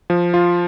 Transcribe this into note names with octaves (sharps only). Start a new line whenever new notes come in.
F3
F4